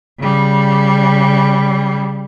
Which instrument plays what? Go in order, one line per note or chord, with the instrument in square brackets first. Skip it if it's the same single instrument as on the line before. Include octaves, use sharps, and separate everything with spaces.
[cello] C#3 G3